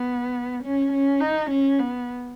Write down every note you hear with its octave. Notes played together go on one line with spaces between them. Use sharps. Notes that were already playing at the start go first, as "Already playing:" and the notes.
Already playing: B3
C#4
C#4
D#4
C#4
B3